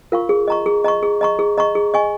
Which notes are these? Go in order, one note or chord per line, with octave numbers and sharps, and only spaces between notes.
F4 A#4 F5 C#6
G#4
D#5 A#5 C#6
G#4
D#5 A#5 C#6
G#4
D#5 A#5 C#6
G#4
D#5 A#5 C#6
G#4
D#5 G#5 C#6